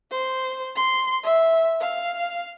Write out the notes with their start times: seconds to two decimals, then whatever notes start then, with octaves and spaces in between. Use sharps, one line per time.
0.11 C5
0.75 C6
1.23 E5
1.80 F5